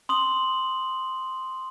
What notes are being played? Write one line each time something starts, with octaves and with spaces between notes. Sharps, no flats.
C6 D#6 F#7